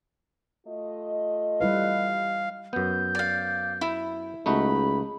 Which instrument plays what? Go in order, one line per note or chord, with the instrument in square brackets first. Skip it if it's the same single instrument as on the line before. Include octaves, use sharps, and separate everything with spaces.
[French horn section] A3 F4 D#5
[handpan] G3 E4 B4 [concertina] F5
[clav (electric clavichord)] F#2 B3 [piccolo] G6
[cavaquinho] D5 F5
E4
[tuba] C#2 [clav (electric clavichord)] A3 D#4 F#4 [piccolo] B5